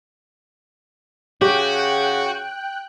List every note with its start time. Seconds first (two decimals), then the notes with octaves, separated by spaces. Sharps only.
1.41 C#3 F#4 G4 G5 F#6